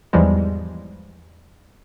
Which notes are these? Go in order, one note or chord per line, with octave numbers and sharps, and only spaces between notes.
E2 G#2 E3 F3 G3 G#3